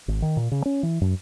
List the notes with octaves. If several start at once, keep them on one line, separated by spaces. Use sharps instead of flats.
G#1
D#3
A#2
C#3
C#4
E3
F#2